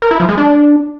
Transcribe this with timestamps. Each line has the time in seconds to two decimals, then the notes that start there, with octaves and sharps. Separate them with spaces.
0.02 A#4
0.11 E4
0.20 F3
0.29 G#3
0.38 D4